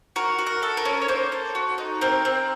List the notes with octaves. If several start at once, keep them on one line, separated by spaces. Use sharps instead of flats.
F#4 A#4
F#4
A#4
A4
A#4
C#4
C#5
A#3 C5
A4
F#4
D#4
C4 A#4
C4